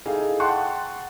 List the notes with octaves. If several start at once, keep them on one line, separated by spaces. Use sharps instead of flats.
D#4 E4 G#4 A4 F5
F#5 G5 A5 C6 C#6 F#6